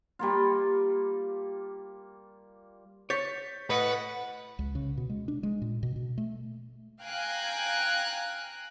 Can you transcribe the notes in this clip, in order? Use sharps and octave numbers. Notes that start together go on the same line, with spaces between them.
G3 A#3 F4
C#5 G6 A6 B6
A2 B4 D#5 F#5 C#7
C#2
C#3
B2
G#3
D4
G#3
A#2
B2
B2
A3
F5 G5 G#5 A#5 F#6